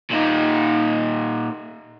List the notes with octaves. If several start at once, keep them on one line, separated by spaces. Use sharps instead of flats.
A#2 D#4